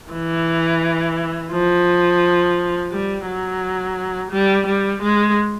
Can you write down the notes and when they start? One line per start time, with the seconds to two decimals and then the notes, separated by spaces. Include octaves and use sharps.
0.12 E3
1.52 F3
2.91 G3
3.26 F#3
4.31 G3
4.66 G3
5.02 G#3